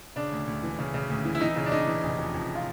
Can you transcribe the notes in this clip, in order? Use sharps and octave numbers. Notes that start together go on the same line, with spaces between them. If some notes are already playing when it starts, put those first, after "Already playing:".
C#3 D4
D2
D2
E3
C#3
C#3
D2
E3
E4
E3 D#4
C#3
D4
C#3 D#4
E3
F1
F2
F2
F4